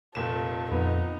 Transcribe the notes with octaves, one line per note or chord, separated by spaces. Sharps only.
F1 A#2 A4 E7
F2 B3 D#4